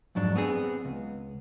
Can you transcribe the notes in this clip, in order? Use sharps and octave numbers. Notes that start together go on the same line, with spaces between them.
F2 G#2 F#3 D4
B3 C4 G#4
C#2